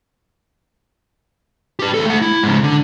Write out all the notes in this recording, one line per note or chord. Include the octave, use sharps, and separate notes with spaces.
G4 B4
D#2 A4
A3 F#5
E4
G#2 C#3
D3